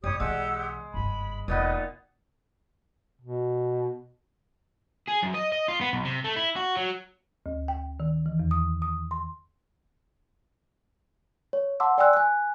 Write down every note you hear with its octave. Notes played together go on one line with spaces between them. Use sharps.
F#2 G3 C#4 G4 C#5 D#6
B1 E3 G#3 G4 F#5 E6
F#1 G2 B5
E1 A#2 B3 D#4 B4 D#5
B2
G#4
F#2
D#5
D#5
F4
B3
B1
C3
A3
E4
F#4
F#3
D2
G5
D#3
E3
E2
D#6
D#6
C6
C#5
F#5 A5 C6 D6 E6
D5 G5 G#5 C6 E6 F#6
G#5 F#6